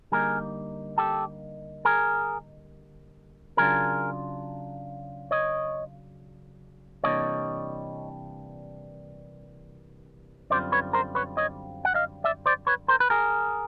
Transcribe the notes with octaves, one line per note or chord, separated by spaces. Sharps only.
D3 G3 A#3 D#4 G#4 A#4
G4 A4
G#4 A#4
C#3 F#3 A3 D4 F4 G#4 A#4
C#5 D#5
C3 E3 G3 A#3 D4 C#5 D#5
F#2 D3 G3 C4 F4 C5 D5
B4 C#5
A#4 C5
B4 C#5
C#5 D#5
F#5
D#5 F5
D5 E5
C5 D5
B4 C#5
A#4 C5
B4
G#4 A#4